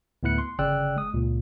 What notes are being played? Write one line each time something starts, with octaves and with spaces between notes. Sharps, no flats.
D2 A2 B3 E4 F#6 C#7
C6
G1 C#3 D5 G5 E6 F#6
G#3 D#6
C#2 A#2